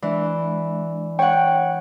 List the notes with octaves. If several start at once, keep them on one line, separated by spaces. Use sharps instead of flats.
E3 G#3 D4 D5
C#5 F#5 G5